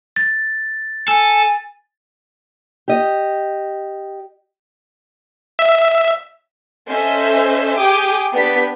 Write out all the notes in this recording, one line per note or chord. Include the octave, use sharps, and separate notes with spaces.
A6
A4 G#5
G4 D#5
E5
C#4 A4 C5 D#5 E5
G4 G#4 G5 G#5 D6 D#6
B3 D4 G4 B6